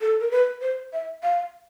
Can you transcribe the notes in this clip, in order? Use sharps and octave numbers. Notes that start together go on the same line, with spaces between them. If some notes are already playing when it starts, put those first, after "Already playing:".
A4
A#4
B4
C5
E5
F5